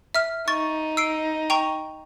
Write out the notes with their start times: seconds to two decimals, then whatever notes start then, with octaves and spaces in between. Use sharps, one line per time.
0.15 E5 F6
0.48 D#4 C#6 A6
0.97 E6 C7 D7
1.50 G5 A#5 C#6